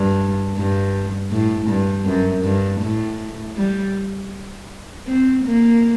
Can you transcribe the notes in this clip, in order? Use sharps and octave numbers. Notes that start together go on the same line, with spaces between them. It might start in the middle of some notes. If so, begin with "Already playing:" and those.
Already playing: G2
G2
A2
G2
F#2
G2
A2
G3
C4
A#3